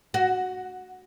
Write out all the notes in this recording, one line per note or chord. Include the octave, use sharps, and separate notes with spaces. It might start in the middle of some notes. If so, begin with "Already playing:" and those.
F#4